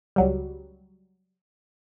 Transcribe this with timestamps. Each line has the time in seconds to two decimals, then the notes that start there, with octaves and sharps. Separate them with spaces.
0.16 C#2 F#3 G3